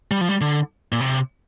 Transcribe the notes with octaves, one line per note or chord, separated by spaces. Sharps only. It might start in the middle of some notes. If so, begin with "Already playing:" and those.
G3
F3
G3
D3
A#2
C3